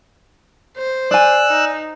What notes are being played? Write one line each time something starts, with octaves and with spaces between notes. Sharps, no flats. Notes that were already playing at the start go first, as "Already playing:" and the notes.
C5
D5 G#5 E6 F#6
D#4